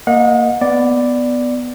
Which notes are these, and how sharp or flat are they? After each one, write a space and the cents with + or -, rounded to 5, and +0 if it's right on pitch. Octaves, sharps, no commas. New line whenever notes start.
A#3 +0 D#5 +0 F#5 -35
B3 +10 D5 +0